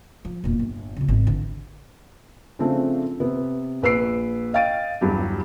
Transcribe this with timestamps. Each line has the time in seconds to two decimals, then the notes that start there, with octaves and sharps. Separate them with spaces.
0.25 F3
0.44 E1 A#2
0.59 G1
0.97 B1 C#3
1.08 G#1
1.27 D3 E3
2.59 C#3 F3 A3 C4 D4
3.20 C3 B3
3.83 A#1 B4 E6 C7 D7
4.53 D#5 F5 G5 A6 D7 D#7
5.01 G1 E2 G2 F#3 G4